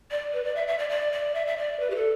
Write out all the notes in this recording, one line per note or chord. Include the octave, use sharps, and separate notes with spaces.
D5
B4
D5
E5
E5
D5
D5
D5
E5
E5
D5
B4
G4
A4